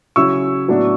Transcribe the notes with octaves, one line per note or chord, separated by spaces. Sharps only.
C#3 F#3 C#4 E4 C#6 E6
A2 F#3 B3 D4